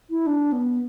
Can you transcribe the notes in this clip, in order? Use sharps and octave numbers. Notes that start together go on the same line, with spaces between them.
E4
D4
B3